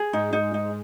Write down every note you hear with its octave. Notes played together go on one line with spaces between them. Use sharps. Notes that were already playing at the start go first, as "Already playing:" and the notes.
Already playing: G#4
G#2 G#3 D#4
D#4
D#4